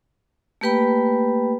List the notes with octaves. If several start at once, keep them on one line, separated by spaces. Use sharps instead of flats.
A3 A#3 G4 B4 G5 B5